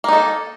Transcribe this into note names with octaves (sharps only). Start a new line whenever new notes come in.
A#3 D#4 A4